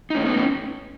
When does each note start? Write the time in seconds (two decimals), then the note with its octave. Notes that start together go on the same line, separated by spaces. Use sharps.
0.10 D#4
0.15 A3 C#4
0.25 B3 D#4
0.36 A3 C#4